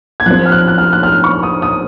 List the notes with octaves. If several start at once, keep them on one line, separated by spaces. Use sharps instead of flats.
G#6
F3 C4 F#6
F6
F#6
F#6
F6
F#6
F6
C#6
D#6
D#6